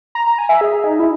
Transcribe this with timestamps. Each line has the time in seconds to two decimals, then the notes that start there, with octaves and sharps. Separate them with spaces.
0.15 A#5
0.26 A#5
0.38 G#5
0.49 E5
0.61 G#4
0.84 D#4
1.00 E4